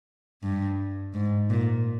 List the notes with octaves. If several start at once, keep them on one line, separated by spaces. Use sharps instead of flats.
G2
G#2
A#2